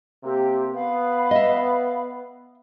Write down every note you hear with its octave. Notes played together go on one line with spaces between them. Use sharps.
C3 A#3 C4 G4
B3 F5 B5
D#5 E5